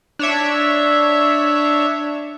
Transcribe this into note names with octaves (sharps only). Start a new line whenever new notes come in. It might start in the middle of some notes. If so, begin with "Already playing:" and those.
D4 C#5 E5